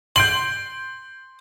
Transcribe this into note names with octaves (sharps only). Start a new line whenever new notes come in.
C6 G6 D7 F#7